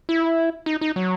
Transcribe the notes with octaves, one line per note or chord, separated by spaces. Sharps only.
E4
D#4
D#4
F#3